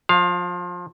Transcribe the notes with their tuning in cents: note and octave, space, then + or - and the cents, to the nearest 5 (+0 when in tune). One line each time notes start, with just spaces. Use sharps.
F3 +25 F5 +0